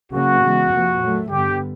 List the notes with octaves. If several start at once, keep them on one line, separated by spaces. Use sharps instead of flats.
C#3 F#3 A#3 C#4 F#4
C#3 E3 G#3 B3
F2 C3 F3 A#3
A#2 F#3 A3
G2 D3 G3 B3 G4